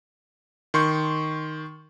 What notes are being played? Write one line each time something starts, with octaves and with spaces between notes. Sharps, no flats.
D#3 C6 C#6 G6